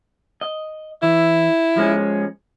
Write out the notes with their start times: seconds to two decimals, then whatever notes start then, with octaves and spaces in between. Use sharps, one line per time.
0.41 D#5
1.03 E3 E4
1.77 F3 G#3 C#4